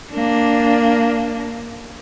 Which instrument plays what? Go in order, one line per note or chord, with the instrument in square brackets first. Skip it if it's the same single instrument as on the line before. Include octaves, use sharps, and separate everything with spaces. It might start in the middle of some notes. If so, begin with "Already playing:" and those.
[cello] A#3 D4